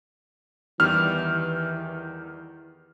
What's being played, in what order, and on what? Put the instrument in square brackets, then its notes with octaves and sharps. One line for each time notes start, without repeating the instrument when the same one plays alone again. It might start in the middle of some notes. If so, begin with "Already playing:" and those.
[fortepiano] E2 D#3 G3 [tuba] E3 [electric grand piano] F6